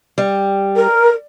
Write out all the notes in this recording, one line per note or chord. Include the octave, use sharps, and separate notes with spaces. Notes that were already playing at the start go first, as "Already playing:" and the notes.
G3
A#4